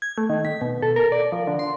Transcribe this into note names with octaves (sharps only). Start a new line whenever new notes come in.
G#6
A3
D#3
B6
B2
A4
A#4
D5
F3
D3
C6